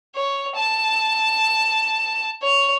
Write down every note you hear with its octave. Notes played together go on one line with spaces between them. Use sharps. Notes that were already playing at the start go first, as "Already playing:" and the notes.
C#5
A5
C#5